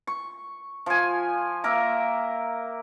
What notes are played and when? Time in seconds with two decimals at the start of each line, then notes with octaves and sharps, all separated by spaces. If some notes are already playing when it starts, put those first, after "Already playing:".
0.07 C#6
0.86 F3 G#5
1.64 A#3 A#4 E5